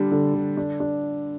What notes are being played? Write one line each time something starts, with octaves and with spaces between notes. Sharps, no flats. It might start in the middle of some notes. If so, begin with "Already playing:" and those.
Already playing: D3 G3 D4
D3
D3
D4
D4